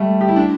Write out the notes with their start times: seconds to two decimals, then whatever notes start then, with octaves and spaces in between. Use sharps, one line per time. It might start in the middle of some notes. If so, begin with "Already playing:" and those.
Already playing: G3 A3
0.21 G4
0.28 E4
0.36 D4